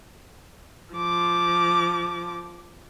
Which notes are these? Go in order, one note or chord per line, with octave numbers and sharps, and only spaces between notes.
F3 D6